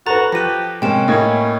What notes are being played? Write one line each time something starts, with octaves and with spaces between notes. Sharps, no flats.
F#4 A4 B4 A#5 A6
F3 G4 F#6 A#6 D#7
C3 G#3 A#3 C#4 G5 E7
A2 A#3 E4 D#5 G#6